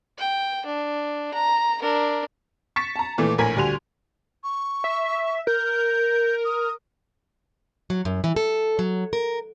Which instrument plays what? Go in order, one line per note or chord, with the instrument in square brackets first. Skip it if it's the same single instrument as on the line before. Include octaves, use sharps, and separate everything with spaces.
[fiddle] G5
D4
A#5
D4 A#4
[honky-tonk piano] C#6 A6 B6 C#7 E7
A5 A#5
A#2 E3 A3
A#1 A2 A#4 G#5 G#6 B6
D2 G3 F#4 G#5 C6 F7
[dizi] C#6
[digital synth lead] E5
[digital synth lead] A#4 [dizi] G6
[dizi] D#6
[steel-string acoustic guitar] F#3
F#2
E3
A4
F#3
A#4